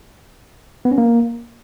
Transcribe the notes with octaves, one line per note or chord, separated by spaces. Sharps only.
B3
C#4
A#3